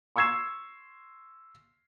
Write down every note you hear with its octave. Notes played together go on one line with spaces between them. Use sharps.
C6 C#6 E6 G#6 C7 E7